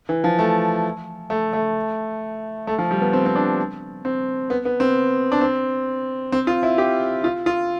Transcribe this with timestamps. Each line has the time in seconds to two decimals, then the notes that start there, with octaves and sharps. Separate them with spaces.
0.09 E3
0.24 F3
0.39 A3
1.30 A3
1.53 A3
2.67 A3
2.78 F3
2.91 G3
3.01 B3
3.13 C4
3.26 C4
3.35 D4
4.05 C4
4.50 B3
4.65 B3
4.80 C4
5.32 D4
5.41 C4
6.32 C4
6.47 F4
6.63 E4
6.78 G4
7.24 F4
7.46 F4